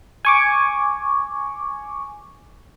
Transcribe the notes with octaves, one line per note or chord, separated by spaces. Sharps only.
G#5 C#6 D6